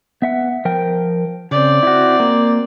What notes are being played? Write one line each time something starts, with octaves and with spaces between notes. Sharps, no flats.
B3 E5 F#5
F3 A#4 G5
C#3 C4 D5
E4 F#4
A#3